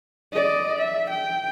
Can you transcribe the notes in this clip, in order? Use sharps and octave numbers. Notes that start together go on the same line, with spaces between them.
D5 D#5
E5
G5